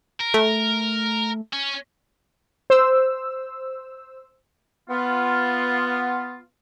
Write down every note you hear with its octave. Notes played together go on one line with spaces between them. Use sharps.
A#4
A3
C#4
C5 E6
B3 F4